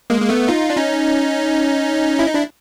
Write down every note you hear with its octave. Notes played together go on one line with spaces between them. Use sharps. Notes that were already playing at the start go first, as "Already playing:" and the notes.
G#3 A#3
A#3
A3 B3
D#4 F4
D4
C#4 D#4
E4
D#4
D4 E4